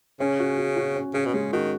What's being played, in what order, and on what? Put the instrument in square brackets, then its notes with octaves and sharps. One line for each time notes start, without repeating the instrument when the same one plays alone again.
[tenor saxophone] C#3 [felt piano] C#4
[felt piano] F#4
F#4
F#4
C#4
[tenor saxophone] C#3 [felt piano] C#4
[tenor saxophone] B2
[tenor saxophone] C#3 [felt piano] G#3
[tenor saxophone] D#3 [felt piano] F#4